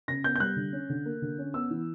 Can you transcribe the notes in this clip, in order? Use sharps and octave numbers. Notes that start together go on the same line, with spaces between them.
C#3 A#6
B3 G6
G6
G3 F#6
D3
C#4
D3
A#3
D3
C#4
B3 E6
E3